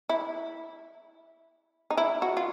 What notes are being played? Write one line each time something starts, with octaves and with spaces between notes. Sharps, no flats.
E4
D#4
E4
F#4
F4